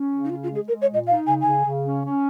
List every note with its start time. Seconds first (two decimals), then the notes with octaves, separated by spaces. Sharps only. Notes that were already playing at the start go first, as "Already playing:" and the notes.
Already playing: C#4
0.10 C#3
0.25 D#4
0.30 C#4 F4
0.43 F4
0.49 G#3
0.55 G#4
0.68 G#3 A#4
0.82 C#5
0.87 A#2
0.94 D#5
1.07 D#4 F5
1.27 C#3 G#5
1.41 C#3 G#5
1.64 C#3
1.85 C#4
2.04 C#4